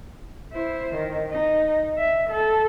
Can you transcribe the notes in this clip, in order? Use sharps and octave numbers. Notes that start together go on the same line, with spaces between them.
E4 C5
D#3
D#4
E5
A4